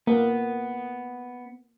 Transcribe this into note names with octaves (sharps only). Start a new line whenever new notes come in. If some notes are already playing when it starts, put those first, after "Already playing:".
A#3 B3